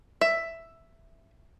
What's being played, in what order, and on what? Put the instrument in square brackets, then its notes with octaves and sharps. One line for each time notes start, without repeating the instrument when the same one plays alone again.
[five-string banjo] E5